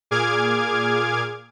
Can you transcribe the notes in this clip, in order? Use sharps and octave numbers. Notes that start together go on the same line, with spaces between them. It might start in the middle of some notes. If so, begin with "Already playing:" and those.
A#2 G#4 D6 F6 G#6